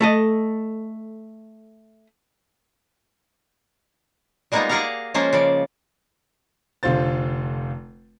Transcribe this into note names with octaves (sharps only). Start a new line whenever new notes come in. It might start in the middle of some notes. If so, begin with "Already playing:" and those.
A3 A4 D#5
G3 G#3 A#3 B3 D#4 F4
A#3 G#4 D5 F5 F#5 A#5
F3 G#3 A#3 C#4 F4 C5
C#3 F3 D5
F1 D3 F4 C5 A6